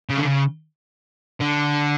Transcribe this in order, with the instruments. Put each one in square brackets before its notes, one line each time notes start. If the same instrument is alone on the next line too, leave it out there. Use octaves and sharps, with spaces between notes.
[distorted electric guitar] C#3
D3
C#3
D3